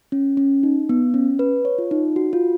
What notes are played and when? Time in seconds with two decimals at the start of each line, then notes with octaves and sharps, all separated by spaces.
0.12 C#4
0.37 C#4
0.63 D#4
0.89 B3
1.14 C#4
1.39 B4
1.65 C#5
1.78 F4
1.91 D#4
2.16 F#4
2.33 F4